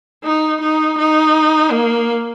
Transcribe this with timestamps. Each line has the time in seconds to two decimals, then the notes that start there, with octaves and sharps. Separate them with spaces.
0.24 D#4
0.61 D#4
0.98 D#4
1.71 A#3